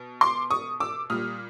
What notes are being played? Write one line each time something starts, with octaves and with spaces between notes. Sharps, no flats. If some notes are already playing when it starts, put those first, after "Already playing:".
Already playing: B2
C6 D6
C#6 D#6
D6 E6
A#2 G3 D#6 F6